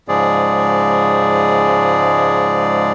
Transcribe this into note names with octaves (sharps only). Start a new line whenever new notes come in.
G#2 C#3 F3 G#3 G#4 D5